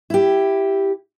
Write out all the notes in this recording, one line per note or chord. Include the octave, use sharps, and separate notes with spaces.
E4 G4